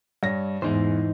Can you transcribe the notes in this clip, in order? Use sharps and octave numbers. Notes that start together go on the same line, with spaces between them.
G2 C#5 A#6
E2 G#2 E3 D#4 C5